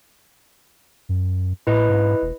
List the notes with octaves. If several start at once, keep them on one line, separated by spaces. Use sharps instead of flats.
F#2
A2 E4 B4 D#5
G#2
E1